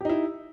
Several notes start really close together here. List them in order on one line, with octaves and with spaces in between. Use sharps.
G4 D#4 E4